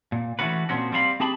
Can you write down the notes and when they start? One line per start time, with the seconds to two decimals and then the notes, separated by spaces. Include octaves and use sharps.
0.12 A#2
0.39 E3 F3 A3 C#4 F#4 B4
0.69 A#2 F3 C4 C#4 F#4
0.92 G3 C4 E4 F5 B5
1.20 C4 G4 G#4 A5 B5